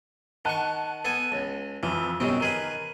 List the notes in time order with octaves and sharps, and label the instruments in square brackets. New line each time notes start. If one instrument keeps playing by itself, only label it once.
[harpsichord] D#3 C#6 [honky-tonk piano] F#5 A5 F#6
[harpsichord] B3 A4 G#5
C#2
[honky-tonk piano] F2 [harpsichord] E3
[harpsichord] F#2 D#3 C4 [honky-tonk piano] B2 G3
[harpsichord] D#3 G#4 B4 [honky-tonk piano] A#4